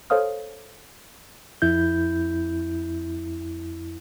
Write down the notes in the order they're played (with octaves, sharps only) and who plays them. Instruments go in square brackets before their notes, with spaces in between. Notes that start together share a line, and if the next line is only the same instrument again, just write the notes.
[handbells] A4 C5 C#5 F5 D#6 F6
[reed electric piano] F2 E4 G6